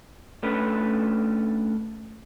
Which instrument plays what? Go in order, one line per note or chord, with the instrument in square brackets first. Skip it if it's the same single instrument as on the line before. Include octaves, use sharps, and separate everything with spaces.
[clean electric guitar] A3 C#4 D4 B4